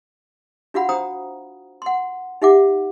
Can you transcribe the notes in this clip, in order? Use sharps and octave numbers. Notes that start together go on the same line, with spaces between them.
D4 F4 F#4 F5 F#5 B5
D4 C5 G5 A#5 D#6
F#5 C6
D#4 G4 E5 F#5 D6